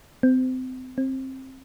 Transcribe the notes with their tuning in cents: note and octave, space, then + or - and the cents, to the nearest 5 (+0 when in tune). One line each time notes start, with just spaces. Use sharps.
C4 -30
C4 +20